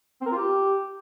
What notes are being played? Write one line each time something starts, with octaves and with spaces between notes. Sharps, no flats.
C4
A#4
F4
G4